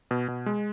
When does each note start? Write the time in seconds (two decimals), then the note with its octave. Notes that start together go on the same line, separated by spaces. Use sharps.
0.11 B2
0.28 B2
0.46 G#3